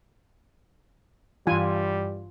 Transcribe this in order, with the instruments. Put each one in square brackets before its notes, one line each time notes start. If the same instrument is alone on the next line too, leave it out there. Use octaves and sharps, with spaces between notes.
[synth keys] G2 E3 [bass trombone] G3 [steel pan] F4 G#5